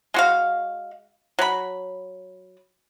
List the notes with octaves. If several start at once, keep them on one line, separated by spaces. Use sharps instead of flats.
G#3 F#4 F5
F#3 B5